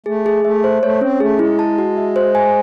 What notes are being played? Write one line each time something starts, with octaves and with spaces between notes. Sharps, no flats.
A3 G#4
G#4
A3 E5
C5
A3 C#5
C4 C#4
A3 G#4
G#3 E4
A5
F#4
E5
C5
G#5